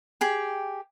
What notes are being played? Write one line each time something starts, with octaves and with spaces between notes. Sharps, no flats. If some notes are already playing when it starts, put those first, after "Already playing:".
G4 G#4 G5